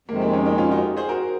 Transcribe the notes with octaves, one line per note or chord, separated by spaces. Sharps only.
F2 C3 D#3 G#3 A#3
C4
A#3 C#4
C4 D#4
C#4 F4
D#4 F#4
G#4 C5
F#4 A#4